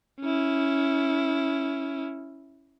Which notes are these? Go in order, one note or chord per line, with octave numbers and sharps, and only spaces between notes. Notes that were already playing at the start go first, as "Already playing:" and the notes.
C#4 E4